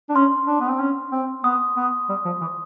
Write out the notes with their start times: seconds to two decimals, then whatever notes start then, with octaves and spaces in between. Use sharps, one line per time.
0.09 D4
0.15 C#4 C6
0.47 D4
0.61 B3
0.70 C4
0.80 C#4
1.12 C4
1.44 B3 D#6
1.77 B3
2.09 G3
2.25 F3
2.41 E3